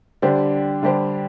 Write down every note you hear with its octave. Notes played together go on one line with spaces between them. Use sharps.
D3 G3 D4 G4 C5
D3 G3 D4 G4 C5